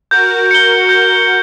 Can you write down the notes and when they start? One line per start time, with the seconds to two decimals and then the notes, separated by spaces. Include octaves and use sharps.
0.11 F#4 A#4 G6
0.51 C#7 G7
0.89 F#4 A#4 G6